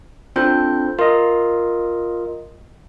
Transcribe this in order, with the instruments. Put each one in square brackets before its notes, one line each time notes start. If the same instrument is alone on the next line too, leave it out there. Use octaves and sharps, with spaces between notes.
[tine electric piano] C4 D4 A4 [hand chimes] F4 C5 G6
[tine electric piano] F4 D#5 [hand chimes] A#4